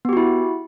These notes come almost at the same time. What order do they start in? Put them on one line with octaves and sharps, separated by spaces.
B3 G4 F#4 E4